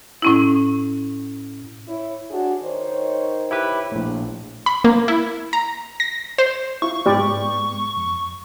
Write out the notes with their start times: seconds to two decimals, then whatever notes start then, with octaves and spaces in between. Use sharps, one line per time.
0.22 A2 C#4 E4
1.88 E4 C#5
2.31 D4 F#4 G#4
2.63 D#3 C5 C#5
3.51 E4 G4 B4
3.92 A#1 A2
4.66 B5
4.84 A#3
5.08 E4
5.53 A#5
6.00 A#6
6.38 C5
6.82 E4 F4 C#6
7.06 G#2 G#3 B3 G4 D5
7.97 F2